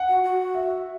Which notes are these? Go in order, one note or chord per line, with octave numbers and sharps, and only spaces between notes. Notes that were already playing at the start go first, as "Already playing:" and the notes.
Already playing: F#5
F#4
F#4
E5